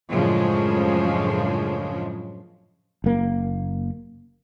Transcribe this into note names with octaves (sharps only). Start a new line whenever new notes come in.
F#2 A2 C#3 F3 G#3 D4
F#1 A#3